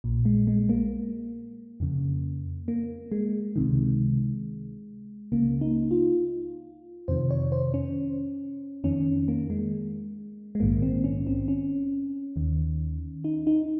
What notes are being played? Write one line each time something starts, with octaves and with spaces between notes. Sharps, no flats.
A#1 A#2
G#3
G#3
A#3
F2 C#3
A#3
G#3
C#2 C3 D#3
C#2 C#3 A#3
D#4
F4
F2 C3 D#3 C5
C#5
C5
C#4
F2 D#3 C#4
A#3
G#3
G#3
A#1 G#2 D#3 A#3
C4
C#4
C4
C#4
D#2 D#3
D#4
D#4